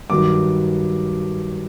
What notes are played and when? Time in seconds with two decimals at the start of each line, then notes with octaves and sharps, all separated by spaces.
0.10 G2 D#3 F#3 D6